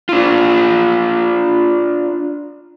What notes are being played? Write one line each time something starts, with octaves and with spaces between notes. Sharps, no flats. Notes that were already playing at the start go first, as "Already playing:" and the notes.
D4 F4